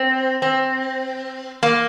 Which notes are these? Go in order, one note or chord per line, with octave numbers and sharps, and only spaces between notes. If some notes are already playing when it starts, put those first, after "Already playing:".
Already playing: C4
C4
A#3